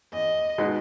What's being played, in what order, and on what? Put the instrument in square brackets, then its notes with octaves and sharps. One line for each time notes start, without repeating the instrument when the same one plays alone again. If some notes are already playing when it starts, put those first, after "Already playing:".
[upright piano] E2 [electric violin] D#5
[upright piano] B2 G#3 B3 D#4